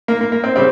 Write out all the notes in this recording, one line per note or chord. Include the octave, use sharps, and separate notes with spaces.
A#3
A#3
A#3
C4
C#3 G3 C4